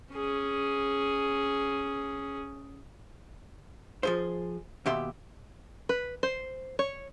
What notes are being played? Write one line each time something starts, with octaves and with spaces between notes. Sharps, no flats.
C#4 G#4
F3 G#4 C5
D#2 B2 G4 E5 C6
B4
C5
C#5